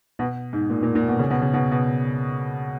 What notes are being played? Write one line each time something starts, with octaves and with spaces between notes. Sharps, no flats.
B2
G#2
A#2
A#2
A#2
B2
C#3
B2
C#3
B2
B2